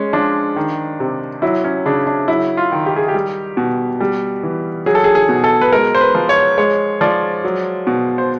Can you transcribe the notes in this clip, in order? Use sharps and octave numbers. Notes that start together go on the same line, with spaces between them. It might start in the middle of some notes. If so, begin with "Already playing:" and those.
Already playing: G#3 C#4
F3 D4
D#3
C3
F#3 E4
C#4
C#3 D4
D4
F#3 E4
F4
D#3
G4
G#4
G4
G3
B2
G3
E3
F#3 G#4
A4
G#4
G#4
B2
A4
B4
G#3 A#4
C5
B4
F3
C#5
G#3 C#5
F3 D5
F#3
B2
C5